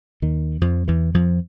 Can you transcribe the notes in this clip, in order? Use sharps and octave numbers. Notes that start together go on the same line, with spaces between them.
D#2 D#3
F2 F3
E2 E3
F2 F3